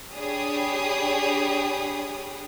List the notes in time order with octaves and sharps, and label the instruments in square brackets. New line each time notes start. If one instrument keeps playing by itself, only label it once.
[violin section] D4 G4 G#4 C#5 B5 D#6